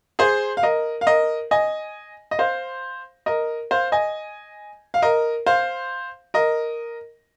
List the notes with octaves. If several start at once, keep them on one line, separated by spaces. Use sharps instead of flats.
G#4 C5
F5
A#4 D#5
F5
A#4 D#5
D#5 G#5
D#5
C5 F5
A#4 D#5
C5 F5
D#5 G#5
F5
A#4 D#5
C5 F5
A#4 D#5